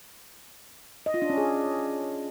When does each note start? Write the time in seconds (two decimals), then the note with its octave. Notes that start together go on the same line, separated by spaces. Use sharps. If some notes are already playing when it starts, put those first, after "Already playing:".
1.06 D#5
1.14 F4
1.22 D4
1.30 C#4
1.37 G#4